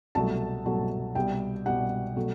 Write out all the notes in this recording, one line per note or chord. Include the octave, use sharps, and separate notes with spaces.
C2 B2 F#3 A3 A5
C2 B2 F#3 A3
C2 B2 G3 G5
C2 B2 G3 F#5
B2 F#3 A3